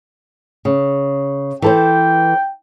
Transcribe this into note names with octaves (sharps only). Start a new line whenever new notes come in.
C#3
E3 A4 C5 G5